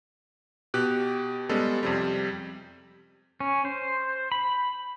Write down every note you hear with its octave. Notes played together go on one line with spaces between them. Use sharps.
B2 G4 F#6
G3 G#3 B3 C#4 A4
F2 C3 G3
C#4
C5
B5